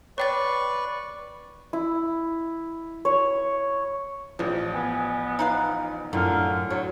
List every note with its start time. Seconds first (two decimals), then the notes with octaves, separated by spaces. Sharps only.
0.18 B4 C#5 D5 G5 C#6 A6
1.73 E4
3.05 C#5
4.39 A1 F3 G3
4.74 B3 G#5
5.39 D#4 B4 F5
6.13 F#2 A2 D3 A#3 F4 G#5 F6
6.70 F#3 C#5